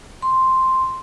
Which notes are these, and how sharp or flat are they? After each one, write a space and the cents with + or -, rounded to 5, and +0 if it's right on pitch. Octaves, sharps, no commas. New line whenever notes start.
C6 +0